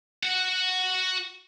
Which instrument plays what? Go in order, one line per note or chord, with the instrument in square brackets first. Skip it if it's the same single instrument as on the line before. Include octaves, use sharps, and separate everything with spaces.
[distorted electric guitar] F#4 F#5